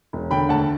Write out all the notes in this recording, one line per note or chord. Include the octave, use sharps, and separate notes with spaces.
E1
D3 G5 B5
D2 F#5 A5